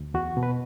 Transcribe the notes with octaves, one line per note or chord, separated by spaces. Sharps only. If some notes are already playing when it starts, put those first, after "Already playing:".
Already playing: D2
E2 F#4
B2
B4